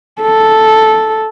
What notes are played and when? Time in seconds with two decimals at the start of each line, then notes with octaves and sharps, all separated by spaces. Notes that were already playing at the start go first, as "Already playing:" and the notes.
0.22 A4